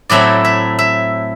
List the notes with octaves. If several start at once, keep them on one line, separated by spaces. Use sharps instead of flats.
A2 F#3 A3 C4 E4 D5
E5
E5